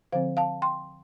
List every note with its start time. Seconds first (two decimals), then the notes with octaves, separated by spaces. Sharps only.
0.12 D3 F3 C4 C5 F5
0.37 F5 A5
0.62 G5 C6